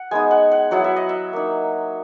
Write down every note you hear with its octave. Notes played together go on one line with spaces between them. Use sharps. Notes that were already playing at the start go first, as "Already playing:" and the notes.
Already playing: F#5
G#3 B3 D#4 G#5
F#5
F#5
F#3 B3 E4 F#5
E5
D#5
E5
A#3 D#4